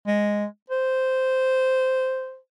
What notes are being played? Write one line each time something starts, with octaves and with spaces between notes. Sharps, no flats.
G#3
C5